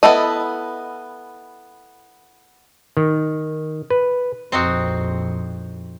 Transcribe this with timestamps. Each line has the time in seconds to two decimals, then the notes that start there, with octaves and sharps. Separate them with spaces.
0.03 B3 E4 A4 D#5
2.97 D#3
3.90 B4
4.52 A#1 F2 C4 D#4 F#4